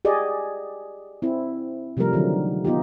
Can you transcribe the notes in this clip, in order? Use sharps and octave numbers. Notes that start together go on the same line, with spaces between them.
G4 G#4 D5 D#5
C4 E4
C3 F3 G3 A3 A#4
D3 D#3 F#3
B3 D#4 F4 G4